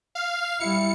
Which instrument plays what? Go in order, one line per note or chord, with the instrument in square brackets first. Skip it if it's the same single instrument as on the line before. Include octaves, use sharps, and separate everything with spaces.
[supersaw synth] F5
[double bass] G3 E4 [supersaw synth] C#7